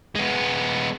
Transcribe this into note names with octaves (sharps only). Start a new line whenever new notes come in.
G#3 B3